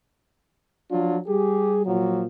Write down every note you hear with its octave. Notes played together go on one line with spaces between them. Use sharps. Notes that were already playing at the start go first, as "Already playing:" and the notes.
F3 F#3 D4 F4
G3 G4 G#4
A#2 F3 F#3